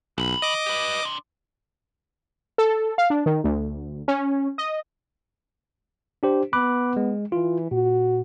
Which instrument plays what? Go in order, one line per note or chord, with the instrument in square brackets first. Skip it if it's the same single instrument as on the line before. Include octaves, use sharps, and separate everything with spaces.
[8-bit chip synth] B1 [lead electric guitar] E3 B5
[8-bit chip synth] D#5 D6
[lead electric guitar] G4 B4
D4 C6
[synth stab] A4
F5
D4
D#3
D2
C#4
D#5
[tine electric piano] D4 G4 C5
[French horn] B3 [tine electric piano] B5 D6 F#6
[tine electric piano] G#3
[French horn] E3 [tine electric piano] F4
[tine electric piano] A#2 [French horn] F#4